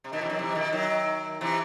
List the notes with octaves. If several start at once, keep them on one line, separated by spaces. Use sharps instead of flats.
C3
B2 D#3
C3 E3
D#3 F#3
C3 E3
B2 D#3
D#3 F#3
C3 E3